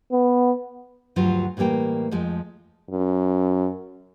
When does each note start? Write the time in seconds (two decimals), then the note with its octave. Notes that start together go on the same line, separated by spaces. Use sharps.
0.12 B3
1.16 D2 G2 F3 F#3 F4
1.57 A2 E3 G3 A#3 G5
2.11 F2 F3 G#3
2.91 F#2